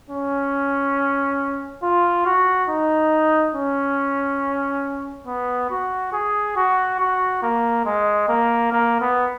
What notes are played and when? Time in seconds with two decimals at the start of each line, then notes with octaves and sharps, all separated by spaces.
0.10 C#4
1.83 F4
2.26 F#4
2.69 D#4
3.55 C#4
5.27 B3
5.70 F#4
6.13 G#4
6.56 F#4
7.00 F#4
7.43 A#3
7.85 G#3
8.29 A#3
8.72 A#3
9.01 B3